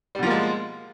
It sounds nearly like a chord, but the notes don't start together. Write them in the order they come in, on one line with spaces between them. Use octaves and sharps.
G3 B2 F3 A#3 G#3